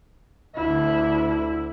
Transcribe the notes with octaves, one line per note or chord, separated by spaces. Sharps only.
D2 E4